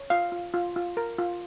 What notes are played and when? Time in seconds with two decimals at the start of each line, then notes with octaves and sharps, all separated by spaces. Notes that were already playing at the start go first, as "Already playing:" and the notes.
Already playing: C#5
0.10 F4 F5
0.32 F4
0.54 F4
0.76 F4
0.97 A#4
1.19 F4